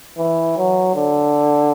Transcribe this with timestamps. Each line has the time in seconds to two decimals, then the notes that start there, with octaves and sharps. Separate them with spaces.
0.18 E3
0.57 F#3
0.95 D3